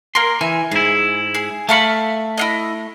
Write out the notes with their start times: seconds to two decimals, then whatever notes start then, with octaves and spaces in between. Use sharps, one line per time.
0.15 A#3 A#4 C6
0.41 E3 G#5
0.72 G#2 E4 G#4
1.34 G#4
1.69 A3 E5 F5 B5 C#6
2.37 E4 F4 D#5